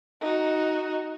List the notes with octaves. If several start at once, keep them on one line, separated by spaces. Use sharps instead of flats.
D#4 F#4